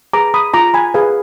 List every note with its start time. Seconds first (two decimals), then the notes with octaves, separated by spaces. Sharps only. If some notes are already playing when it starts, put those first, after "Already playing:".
0.13 G#4 B4 A#5 D6
0.34 B5 D#6
0.54 F4 A#5 D6
0.74 G#5 B5
0.94 G#4 B4 F5 G#5